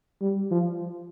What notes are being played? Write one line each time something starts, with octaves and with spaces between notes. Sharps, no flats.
G3
F3